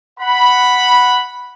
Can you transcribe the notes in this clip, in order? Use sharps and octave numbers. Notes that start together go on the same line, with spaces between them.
F#5 B5